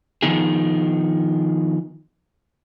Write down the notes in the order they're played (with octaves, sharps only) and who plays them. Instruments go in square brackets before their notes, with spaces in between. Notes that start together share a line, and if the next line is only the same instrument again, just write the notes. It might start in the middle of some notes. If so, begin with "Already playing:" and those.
[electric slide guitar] D#3 F3 B3 D#4 G#4